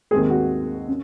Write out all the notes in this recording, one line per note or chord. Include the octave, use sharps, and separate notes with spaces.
D#2 D#3 G#3 C4 G#4
F#4
C#4